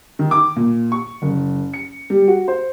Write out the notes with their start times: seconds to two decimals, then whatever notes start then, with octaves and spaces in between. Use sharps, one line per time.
0.19 D#3
0.31 D6
0.56 A#2
0.92 C#6
1.22 F#1
1.74 C#7
2.10 G3
2.28 F#4
2.48 C5